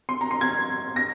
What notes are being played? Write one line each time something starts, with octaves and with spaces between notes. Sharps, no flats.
C6
A#5
C6
G#6
A#6